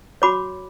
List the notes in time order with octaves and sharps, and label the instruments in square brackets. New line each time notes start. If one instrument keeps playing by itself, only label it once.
[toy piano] F#4 C#5 B5 D6